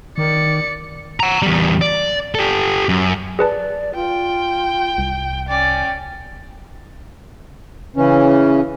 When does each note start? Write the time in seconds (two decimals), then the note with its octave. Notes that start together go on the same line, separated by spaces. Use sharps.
0.18 D#3 D5 C#7
1.20 F#5 A#5
1.42 E2 G3
1.81 D5
2.35 G4 A4
2.89 F#2
3.39 G#4 B4 D5 A5
3.95 F4 G5
4.98 C2
5.48 C#4 D5 G5
7.96 C#3 E3 C#4